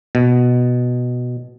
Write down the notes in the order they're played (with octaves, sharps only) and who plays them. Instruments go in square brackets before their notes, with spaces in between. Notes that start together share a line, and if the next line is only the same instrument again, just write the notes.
[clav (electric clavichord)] B2